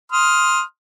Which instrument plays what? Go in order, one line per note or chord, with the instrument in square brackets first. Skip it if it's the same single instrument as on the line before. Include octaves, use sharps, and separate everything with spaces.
[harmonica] C6 D#6 F6